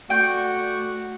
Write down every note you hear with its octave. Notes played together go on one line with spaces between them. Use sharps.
A3 F#4 D5 F#5 G5 C#6